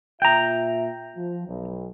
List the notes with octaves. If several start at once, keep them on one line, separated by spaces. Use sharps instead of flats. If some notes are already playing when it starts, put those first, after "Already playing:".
A#2 F4 E5 G5 A#5
F3
B1